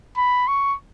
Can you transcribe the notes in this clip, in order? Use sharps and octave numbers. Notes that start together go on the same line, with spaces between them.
B5
C#6